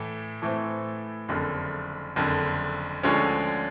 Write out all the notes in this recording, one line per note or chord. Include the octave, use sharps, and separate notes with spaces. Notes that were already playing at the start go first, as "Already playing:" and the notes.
Already playing: A2 E3 A3
A2 E3 A3 C4
F#1 F2 D3
F#1 F2 D3
D2 D3 F3 G#3 C#4